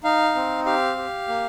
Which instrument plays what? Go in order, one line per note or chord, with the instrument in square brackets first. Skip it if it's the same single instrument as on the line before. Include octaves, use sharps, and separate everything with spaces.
[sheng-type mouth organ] D#4 F5
C4
G4 F5
G4
A#3